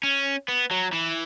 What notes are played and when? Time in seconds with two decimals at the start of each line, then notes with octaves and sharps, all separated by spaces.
0.03 C#4
0.48 B3
0.71 F#3
0.93 E3